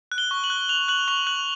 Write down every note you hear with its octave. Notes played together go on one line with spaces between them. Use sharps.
F#6
G7
C#6
F#7
F#6
F#6 F7
F#6 F#7
C#6 F7
F#6 F#7